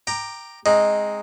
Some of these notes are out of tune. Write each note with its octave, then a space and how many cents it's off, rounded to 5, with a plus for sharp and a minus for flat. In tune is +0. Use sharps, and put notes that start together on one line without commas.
G5 +0 A#5 +0 D6 +20
G#3 +0 C4 +20 D#4 +0